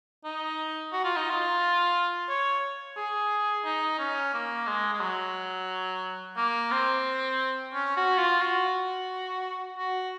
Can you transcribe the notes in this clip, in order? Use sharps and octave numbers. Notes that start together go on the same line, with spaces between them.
D#4
F#4
F4
D#4
F4
C#5
G#4
D#4
C#4
A#3
G#3
G#3
F#3
A#3
C4
C#4
F#4
F4
F#4
F#4